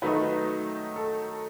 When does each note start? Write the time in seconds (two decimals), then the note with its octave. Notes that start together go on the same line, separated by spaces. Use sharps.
0.02 D#3 F#3 A3 D#4 B4
0.96 A4